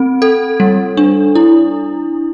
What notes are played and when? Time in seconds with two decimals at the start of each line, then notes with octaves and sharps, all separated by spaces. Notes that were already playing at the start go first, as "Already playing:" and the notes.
Already playing: C4
0.22 A4
0.60 G3
0.97 D4
1.35 E4